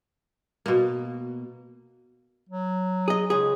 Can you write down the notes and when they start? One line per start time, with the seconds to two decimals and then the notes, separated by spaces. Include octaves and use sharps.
0.66 B2 A#3
2.49 F#3
3.08 G#4 D#5
3.30 C#2 G#4